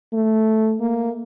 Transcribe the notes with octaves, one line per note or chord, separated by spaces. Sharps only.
A3
A#3